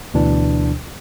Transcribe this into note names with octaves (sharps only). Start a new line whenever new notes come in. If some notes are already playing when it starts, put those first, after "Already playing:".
D2 B2 E3 D4